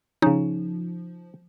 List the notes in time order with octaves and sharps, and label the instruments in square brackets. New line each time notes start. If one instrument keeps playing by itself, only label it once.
[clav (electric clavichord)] C#3 C#4 [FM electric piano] F3 [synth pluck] D#4